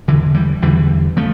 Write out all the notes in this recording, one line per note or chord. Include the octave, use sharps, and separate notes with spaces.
E2 D3 E3
E3 G3
E2 D3 E3 G3
F3 A3